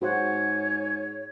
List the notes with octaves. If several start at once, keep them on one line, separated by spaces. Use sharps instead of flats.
G#2 F#4 C5 C#5 F#5